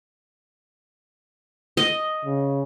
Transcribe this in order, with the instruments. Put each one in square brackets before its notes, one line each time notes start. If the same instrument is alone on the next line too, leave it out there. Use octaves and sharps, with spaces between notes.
[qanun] D#5
[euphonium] C#3